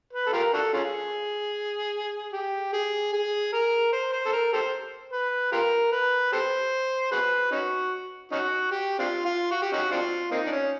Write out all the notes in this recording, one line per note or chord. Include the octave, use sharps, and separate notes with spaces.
B4
A4
F4 G4 A#4
D4 F#4 A4
C#4 F4 G#4
G4
G#4
G#4
A#4
C5
C5
A4
A#4
G4 A4 C5
B4
F4 G4 A#4
B4
G4 A4 C5
F#4 G#4 B4
C#4 D#4 F#4
C#4 D#4 F#4
G4
C4 D4 F4
F4
F#4
G4
C#4 D#4 F#4
C4 D4 F4
A#3 C4 D#4
D4
C#4